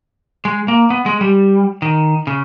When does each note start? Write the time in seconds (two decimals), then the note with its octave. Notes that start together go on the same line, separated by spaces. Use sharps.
0.45 G#3
0.68 A#3
0.90 B3
1.06 G#3
1.21 G3
1.82 D#3
2.27 C#3